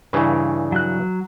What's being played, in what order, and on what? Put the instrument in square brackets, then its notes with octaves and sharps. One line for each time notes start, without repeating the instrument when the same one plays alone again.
[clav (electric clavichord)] G2 C#3 E3
[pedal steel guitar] F#3 F#6